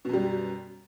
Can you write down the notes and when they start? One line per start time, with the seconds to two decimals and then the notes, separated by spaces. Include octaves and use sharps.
0.05 B2
0.09 F#2
0.13 G3